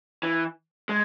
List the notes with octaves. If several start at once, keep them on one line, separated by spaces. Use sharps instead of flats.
E3
G#3